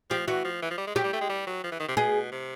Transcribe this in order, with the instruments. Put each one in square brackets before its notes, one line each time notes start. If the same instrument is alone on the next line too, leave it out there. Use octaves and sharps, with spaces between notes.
[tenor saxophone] F3 [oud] G4
[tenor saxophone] E3 [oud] F#4
[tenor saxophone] F3
E3
F3
G3
G#3
[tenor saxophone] F#3 [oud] G4
[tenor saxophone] G3
A3
G#3
G3
F#3
F3
E3
D#3
C3
[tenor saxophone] B2 [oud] G#4
[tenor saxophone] C3